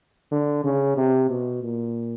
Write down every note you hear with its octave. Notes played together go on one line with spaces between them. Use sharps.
D3
C#3
C3
B2
A#2